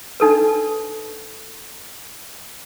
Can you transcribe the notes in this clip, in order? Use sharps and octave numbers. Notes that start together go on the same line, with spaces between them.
D4 D#4 A4 B4